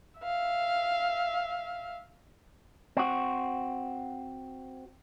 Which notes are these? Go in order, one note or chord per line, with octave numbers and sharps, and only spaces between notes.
E5 F5
C4 F#4